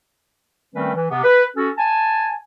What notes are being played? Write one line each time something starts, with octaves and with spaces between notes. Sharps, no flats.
D#3 G3 A3 C4 C#4 B4
E3
C3 B3
B4
C#4 F#4 A4
G#5 A5